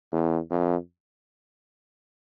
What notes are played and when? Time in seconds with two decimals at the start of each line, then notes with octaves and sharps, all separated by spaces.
0.12 E2
0.50 F2